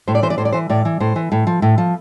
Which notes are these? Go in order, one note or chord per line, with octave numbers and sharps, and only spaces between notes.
A2 C5
D5
E3 C5
D5
A2 C5
D5
E3 C5
A2 D5
E3
A2 C5
E3
A2
F3
A2
F3